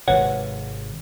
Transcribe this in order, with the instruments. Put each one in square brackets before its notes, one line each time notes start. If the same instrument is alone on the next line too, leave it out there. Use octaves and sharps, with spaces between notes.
[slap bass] G#1 C3 [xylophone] B4 C#5 [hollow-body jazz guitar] F#5